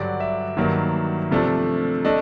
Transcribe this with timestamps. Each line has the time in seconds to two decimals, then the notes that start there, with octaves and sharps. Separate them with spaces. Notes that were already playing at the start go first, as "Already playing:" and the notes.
Already playing: G2 D3 F#3 D5
0.20 E5
0.57 G2 D#3 F#3 A#3
1.31 C3 F3 A3 D4
2.05 A3 D4 D#5